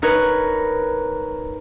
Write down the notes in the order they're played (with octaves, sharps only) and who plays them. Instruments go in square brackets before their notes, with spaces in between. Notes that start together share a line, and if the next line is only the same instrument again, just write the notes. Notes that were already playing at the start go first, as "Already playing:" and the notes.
[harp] D#4 A#4 B4 C#5